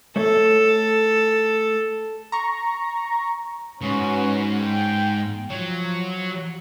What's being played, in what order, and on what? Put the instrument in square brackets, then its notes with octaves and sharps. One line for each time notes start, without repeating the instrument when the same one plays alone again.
[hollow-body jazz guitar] A3 C#5 [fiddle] A4
[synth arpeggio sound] A#5 C#6
[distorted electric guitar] G#2 [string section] C#4 F#4 B4
[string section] G5
[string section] F3 [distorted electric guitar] F#3